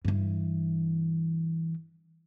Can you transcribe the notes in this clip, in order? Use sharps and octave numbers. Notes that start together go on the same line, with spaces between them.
G2 E3